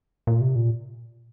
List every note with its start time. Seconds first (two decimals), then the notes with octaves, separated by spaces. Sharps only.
0.27 A#2
0.41 C3
0.55 A#2